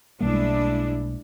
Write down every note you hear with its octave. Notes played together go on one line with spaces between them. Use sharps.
B1 G3 G#3 A#3 D4 E4